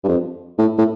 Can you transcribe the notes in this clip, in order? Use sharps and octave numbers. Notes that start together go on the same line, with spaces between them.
G2
F2
A2
A2